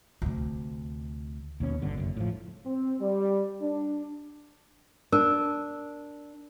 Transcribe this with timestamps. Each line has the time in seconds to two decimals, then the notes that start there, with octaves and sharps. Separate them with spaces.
0.22 D2 C3
1.60 D#2 B2 C#4
1.82 G1 B2 D3
1.97 F#1 F#2
2.17 A2 F3
2.65 C4
3.00 G3
3.60 D4
5.12 D4 A#4